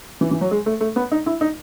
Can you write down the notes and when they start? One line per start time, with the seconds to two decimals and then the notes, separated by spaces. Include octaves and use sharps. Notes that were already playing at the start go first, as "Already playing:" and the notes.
0.21 E3
0.31 E3
0.41 F#3
0.51 G#3
0.66 A3
0.80 A3
0.96 B3
1.11 D#4
1.26 E4
1.41 D#4